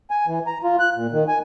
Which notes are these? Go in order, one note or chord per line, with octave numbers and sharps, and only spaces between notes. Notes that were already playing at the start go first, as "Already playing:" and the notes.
G#5
E3
A#5
F4
F#6
A#2
D#3
G#5